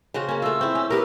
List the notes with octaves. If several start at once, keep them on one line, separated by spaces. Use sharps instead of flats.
C#3 C4 F#4
A#3 C#4
A3 F4 E6
C4 E4
C#4
B3 G4 A#4